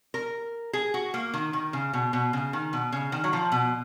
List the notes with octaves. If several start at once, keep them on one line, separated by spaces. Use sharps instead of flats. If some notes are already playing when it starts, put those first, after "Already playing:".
A#4
G#4
F#4
A#3
D#3
D#3
C#3
B2
B2
C#3
D#3
B2
C#3
D#3
F#3
F3
B2